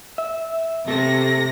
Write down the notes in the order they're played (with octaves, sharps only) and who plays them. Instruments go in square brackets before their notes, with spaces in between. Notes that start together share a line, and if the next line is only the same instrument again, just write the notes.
[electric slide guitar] E5
[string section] C3 A#6 [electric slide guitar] A3 A4